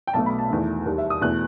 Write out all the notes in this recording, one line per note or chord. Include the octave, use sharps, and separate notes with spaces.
G5
B1 B2 A3 A5
B5
A5
E2 D#3 A3
D#2 D#3 G3
E5
D#6
E2 B2 A3 F#6